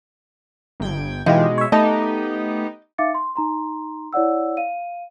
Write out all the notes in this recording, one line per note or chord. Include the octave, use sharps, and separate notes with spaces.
G1 G5 G#6
B2 E3 G#3 D#4 F4 G4
C#5 E5
A3 B3 D#4 G4 D#5 A5
D#4 E5 F5 D6 A6 C#7
C6
D#4 A#5 C6
E4 C#5 D5 F#5 E6
F5 D#7